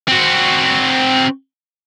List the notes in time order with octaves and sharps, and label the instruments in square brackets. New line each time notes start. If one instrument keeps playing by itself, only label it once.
[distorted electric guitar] C4 F#4